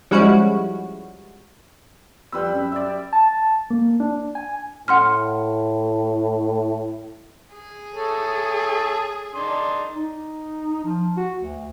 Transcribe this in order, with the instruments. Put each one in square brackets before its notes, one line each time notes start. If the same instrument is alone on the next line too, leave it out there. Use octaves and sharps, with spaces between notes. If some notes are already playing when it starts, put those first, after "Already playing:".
[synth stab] F3 G3 G#3 C#4 E4 F#4
[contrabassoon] F2 [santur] G3 B4 E6
[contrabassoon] F#2
[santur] D5 E5
[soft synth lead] A5
A#3
D4
G#5
[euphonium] A2 [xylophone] F#5 C6 F6
[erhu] G#4
[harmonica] A3 A4 C#5
D4 D#4 C6
[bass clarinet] D#4
F3
F#4
D2